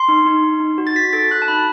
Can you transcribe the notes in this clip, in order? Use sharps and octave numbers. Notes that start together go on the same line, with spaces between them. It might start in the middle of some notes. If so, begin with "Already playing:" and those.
Already playing: C6
D#4
D#4
D#4
D#4
F#4
A6
F#4 B6
A4 A6
F#4 F#6
A5
D#4 B5